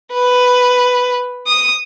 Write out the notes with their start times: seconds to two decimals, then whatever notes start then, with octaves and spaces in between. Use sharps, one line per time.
0.14 B4
1.47 D#6